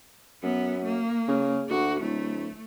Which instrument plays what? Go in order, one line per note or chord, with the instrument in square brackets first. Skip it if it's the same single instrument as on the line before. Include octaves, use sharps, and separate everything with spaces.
[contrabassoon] F#2 [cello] B3
[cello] A#3
[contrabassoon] C#3
[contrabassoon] D2 [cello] F#4
[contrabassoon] D1 [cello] A3